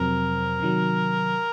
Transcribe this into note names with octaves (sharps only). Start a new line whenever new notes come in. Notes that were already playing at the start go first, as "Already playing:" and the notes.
Already playing: F2 C3 F#3 C4 A#4
C3 D#3 F#3